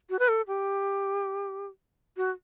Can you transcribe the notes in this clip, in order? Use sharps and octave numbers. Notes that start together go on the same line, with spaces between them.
F#4
B4
A4
G4
F#4